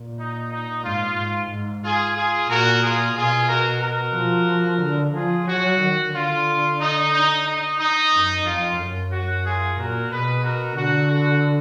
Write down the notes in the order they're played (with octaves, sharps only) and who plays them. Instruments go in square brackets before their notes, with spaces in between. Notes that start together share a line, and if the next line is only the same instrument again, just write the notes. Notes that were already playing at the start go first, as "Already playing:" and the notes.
Already playing: [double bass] A#2
[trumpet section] D#4
D#4
[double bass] G#2 [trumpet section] F4
[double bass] G#2
G#2
[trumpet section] F4 G#4
F4 G#4
[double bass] A#2 [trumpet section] F#4 A#4
[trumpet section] F4 G#4
[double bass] B2 [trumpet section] F4 G#4
[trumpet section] F#4 A#4
F#4 A#4
[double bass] F3
D3
[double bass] F3 [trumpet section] F4 G#4
[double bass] F#3 [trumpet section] F#4
[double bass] D#3
[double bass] D3 [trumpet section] F4
[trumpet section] D#4
D#4
D#4
D#4
[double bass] F#2
[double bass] F2 [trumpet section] F4
[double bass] F#2
[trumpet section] F#4
F4 G#4
[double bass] A#2 [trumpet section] F#4 A#4
[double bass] B2 [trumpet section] G#4 B4
[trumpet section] F#4 A#4
[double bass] D3 [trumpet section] F#4
[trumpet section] F#4